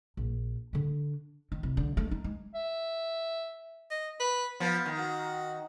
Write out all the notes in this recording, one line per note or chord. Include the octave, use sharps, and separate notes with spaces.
A#1
D3 D4
D#3
C2
D3
A3
D#4
G#3
E5
D#5
B4
F3 B3
D#3
F#4